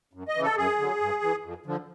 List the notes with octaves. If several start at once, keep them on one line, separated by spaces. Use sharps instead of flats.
F#2
D#5
C#3 E3
A4
F#2 G#4
D3 F#3
G2
E3
F2
D3 F3